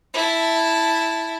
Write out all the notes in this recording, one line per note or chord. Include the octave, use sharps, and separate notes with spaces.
E4 A5